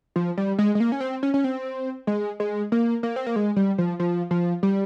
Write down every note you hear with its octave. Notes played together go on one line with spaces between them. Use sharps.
F3
G3
G#3
G#3
A#3
C#4
C4
C#4
C#4
C4
G#3
G#3
A#3
A#3
C4
A#3
G#3
G3
F3
F3
F3
G3